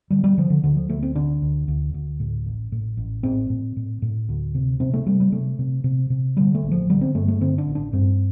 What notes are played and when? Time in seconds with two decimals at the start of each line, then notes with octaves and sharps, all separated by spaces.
0.10 D3 G3
0.24 G3
0.38 D3 F3
0.50 D3
0.63 D2 D3
0.76 F3
0.89 D2 A3
1.02 C4
1.15 D3 D4
1.42 D2
1.68 D2
1.94 D2
2.20 A2
2.46 A1
2.72 A2
2.97 A1
3.23 A2 C4
3.50 A2
3.76 A2
4.02 A2
4.29 D2
4.55 C3
4.80 C3 C4
4.94 A3
5.06 C3 G3
5.20 G3
5.32 C3 A3
5.59 C3
5.84 C3
6.10 C3
6.37 D3 G3
6.55 A3
6.63 A1
6.71 F3
6.89 D3 G3
7.01 C4
7.15 G2 A3
7.28 A3
7.41 D3 C4
7.58 D4
7.67 A1
7.75 D4
7.93 G2 C4